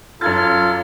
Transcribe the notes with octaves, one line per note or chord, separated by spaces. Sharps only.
F#2 F4 A4 F6 G#6 A6